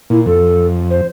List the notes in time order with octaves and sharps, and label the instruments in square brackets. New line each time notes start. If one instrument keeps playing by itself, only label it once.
[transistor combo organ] A#2 [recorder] E4
[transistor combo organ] F2 [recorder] A4
[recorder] C5